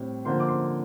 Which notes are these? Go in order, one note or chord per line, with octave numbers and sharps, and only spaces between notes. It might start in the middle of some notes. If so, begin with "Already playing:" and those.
Already playing: A2 G3 C4
D3 F3 A#3 C5 C6
D6
C5 C6